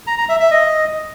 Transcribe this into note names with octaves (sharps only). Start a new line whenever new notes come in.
A#5
A#5
E5
E5
D#5